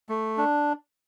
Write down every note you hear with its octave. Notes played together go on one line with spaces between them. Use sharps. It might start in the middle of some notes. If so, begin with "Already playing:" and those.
A3
D4